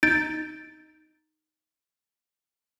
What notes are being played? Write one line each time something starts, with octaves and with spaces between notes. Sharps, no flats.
D#4 G6 A6 D7